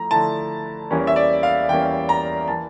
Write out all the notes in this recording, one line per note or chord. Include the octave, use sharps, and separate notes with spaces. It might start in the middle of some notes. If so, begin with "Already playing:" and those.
Already playing: F3 A3 E4 A#5
D3 F3 A3 E4 A5
E2 E3 G3 A#3 C#4
E5
D5
F5
E2 E3 G3 A#3 C#4 G5
A#5
E3 A#3 A5